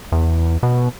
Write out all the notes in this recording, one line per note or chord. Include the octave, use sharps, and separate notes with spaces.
E2
B2